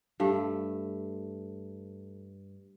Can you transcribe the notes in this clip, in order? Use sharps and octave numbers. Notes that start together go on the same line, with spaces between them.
G2 A3